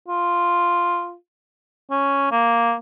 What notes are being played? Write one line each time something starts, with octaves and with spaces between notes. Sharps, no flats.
F4
C#4
A#3